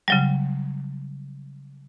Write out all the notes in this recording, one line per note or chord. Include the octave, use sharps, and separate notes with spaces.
C#3 F#3 G3